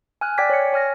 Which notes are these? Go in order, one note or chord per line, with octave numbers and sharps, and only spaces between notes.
G#5 F6 F#6
D5 G5 G#5 D6 G#6 B6
C#5 C#7
C#5 G#5 F6 A#6